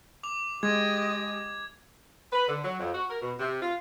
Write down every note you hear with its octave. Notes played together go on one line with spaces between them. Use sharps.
D6 F7
G#3 G4 D#5 G#6
B4
D3
F#3
F2
F#4
A#4
B2
C3
F4